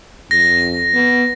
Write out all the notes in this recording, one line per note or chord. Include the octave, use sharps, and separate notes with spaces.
F2 A#6
B3